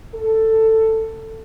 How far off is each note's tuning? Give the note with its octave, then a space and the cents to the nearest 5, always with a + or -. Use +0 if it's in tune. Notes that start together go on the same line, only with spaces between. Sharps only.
A4 +10